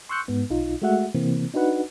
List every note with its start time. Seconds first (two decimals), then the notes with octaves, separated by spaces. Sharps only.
0.09 C6 C#6 E6 F#6 G6 C#7
0.28 G#2 B3
0.50 B1 D#4 F4
0.82 G#3 A3 F#4 E5 F#5
1.15 C3 E3 A#3 C4
1.54 D4 D#4 F#4 B4 F#5